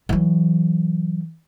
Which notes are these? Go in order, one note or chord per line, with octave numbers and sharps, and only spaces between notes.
E3 F#3